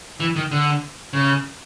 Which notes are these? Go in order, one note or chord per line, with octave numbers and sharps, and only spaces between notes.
E3
D#3
D3
C#3